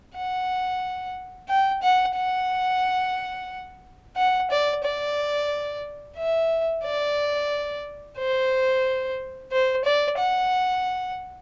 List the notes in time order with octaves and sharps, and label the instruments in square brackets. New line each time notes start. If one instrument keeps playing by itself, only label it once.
[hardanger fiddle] F#5
G5
F#5
F#5
F#5
D5
D5
E5
D5
C5
C5
D5
F#5